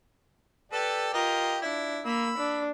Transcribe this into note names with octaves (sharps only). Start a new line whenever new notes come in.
G4 A4 B4 D5
F4 G4 A#4 D#5
D4 E4
A#3 B5 E6
D4